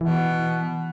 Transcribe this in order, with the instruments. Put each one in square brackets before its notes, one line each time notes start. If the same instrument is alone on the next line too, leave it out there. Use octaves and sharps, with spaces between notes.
[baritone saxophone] B2 [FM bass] E3